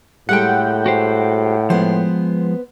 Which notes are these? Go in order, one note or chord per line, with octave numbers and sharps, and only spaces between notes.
A2 G3 G#3 A4 F#5 G5
F#4 G4 C5
F3 G#3 B3 C5